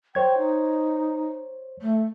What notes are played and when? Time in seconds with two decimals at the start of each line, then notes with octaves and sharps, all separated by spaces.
0.15 C5 C#5 G5 G#6
0.38 D#4
1.82 A3